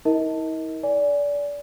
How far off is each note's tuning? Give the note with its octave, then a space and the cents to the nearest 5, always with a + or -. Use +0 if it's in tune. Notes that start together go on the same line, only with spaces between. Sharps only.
E4 -45 A#4 +0 D#5 +30
D5 -25 G#5 +0